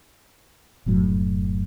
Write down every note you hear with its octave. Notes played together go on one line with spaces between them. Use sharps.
F1 F#2 A2 F#3